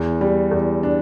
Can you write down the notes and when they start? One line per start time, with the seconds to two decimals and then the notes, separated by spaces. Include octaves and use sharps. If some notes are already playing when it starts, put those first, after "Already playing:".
Already playing: E2
0.21 G3
0.51 E2
0.83 D4